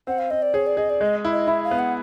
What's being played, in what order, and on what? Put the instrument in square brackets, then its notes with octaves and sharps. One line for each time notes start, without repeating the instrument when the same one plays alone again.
[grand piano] C4 [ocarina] F#5
[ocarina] F5
[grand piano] C4 [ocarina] D#5
[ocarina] D5
[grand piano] G#4 [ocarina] C#5
[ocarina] D5
[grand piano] G#4 [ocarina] D#5
[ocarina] D5
[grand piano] G#3 [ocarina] D#5
[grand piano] E4
[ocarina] D#5
[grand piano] E4 [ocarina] E5
[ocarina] F5
[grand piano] B3
[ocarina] F#5